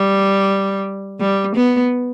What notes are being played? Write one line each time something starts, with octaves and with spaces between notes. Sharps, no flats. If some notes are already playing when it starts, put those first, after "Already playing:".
Already playing: G3
G3
B3